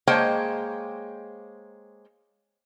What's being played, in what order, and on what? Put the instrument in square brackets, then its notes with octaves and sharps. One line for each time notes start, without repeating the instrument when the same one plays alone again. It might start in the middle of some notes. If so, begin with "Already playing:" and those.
[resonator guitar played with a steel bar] G#3 A#3 C5 C#5 G5